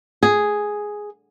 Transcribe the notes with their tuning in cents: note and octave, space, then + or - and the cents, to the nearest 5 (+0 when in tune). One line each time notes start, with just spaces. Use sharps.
G#4 +0